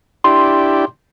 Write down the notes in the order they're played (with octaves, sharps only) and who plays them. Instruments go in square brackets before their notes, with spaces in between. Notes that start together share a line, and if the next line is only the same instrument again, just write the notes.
[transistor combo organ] D4 E4 G4 [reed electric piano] C6